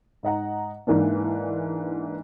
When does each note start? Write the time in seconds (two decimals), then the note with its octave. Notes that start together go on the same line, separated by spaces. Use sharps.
0.23 G#2 D#5 F#5 A#5
0.87 G#2 E3 A#3 D4